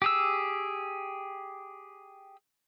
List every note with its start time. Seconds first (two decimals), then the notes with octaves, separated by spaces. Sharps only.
0.02 G4 G#4 E6